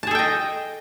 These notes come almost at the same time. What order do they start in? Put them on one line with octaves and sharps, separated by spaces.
A5 G#4 A4 G5 D#5